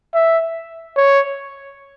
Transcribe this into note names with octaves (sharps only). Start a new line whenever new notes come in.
E5
C#5